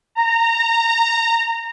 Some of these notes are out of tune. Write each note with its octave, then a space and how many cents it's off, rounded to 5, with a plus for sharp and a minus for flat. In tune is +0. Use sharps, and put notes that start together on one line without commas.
A#5 -20